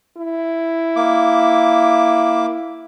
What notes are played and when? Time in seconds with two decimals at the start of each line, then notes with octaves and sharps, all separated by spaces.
0.17 E4
0.96 A#3 D6